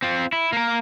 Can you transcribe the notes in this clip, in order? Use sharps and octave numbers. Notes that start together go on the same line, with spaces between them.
C4 F4
E4
A#3 A#4